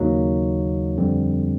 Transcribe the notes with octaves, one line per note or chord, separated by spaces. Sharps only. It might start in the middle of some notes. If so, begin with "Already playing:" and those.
Already playing: D#2 C#3 F#3 A#3 D#4
F2 D3 G3 C4